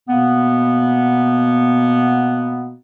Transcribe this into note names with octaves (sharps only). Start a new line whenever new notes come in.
B2 A#3 B3